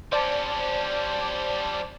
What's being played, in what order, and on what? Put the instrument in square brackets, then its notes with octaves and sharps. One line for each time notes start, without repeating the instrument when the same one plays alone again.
[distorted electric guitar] G3 C#4 [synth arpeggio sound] C5 D5 A5